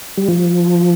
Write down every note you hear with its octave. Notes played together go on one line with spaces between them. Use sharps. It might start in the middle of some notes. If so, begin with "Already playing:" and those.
G3
F3